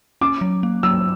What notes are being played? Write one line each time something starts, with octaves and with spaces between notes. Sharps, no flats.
C#4 D6
F#3
A#3
F#3 E6